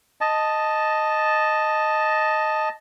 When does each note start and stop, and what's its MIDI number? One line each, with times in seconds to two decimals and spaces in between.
0.21 2.69 75
0.21 2.69 81